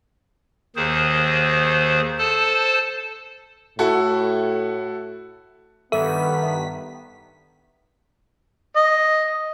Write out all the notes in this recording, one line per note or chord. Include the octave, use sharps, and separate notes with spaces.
D#2 D#3 G#4 C5
A4 C5 A5
A2 E4 F#4 A4
G2 D#3 B3 A4 E5 B6
D#5